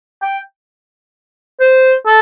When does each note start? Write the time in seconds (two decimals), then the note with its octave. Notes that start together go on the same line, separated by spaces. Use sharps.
0.22 G5
1.60 C5
2.07 A4